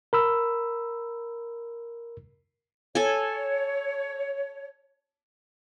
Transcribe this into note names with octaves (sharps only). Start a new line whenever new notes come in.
A#4 B5 E6
A4 C#5 G#5